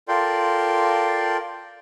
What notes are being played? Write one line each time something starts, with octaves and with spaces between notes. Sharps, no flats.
F4 A4 A#4 D5 G5 C6